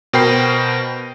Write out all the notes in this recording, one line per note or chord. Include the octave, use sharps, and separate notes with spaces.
B2 A#4 C5 G5 B5 C7